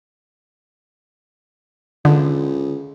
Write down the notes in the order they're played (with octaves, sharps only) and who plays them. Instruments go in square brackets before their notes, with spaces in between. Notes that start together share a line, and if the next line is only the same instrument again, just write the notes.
[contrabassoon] C#2 [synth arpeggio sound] D3